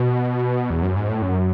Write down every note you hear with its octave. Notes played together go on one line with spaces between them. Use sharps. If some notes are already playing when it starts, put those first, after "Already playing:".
Already playing: B2
E2
F#2
G#2
A2
F#2